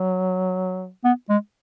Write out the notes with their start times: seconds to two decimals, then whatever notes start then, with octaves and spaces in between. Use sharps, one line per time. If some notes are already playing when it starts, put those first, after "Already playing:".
Already playing: F#3
1.04 B3
1.29 G#3